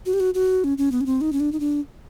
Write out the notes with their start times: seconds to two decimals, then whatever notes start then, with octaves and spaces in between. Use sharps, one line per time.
0.06 F#4
0.13 G4
0.20 F#4
0.34 F#4
0.64 C#4
0.78 C#4
0.92 B3
1.01 C#4
1.06 C4
1.21 D#4
1.33 C#4
1.40 D4
1.52 D#4
1.60 D4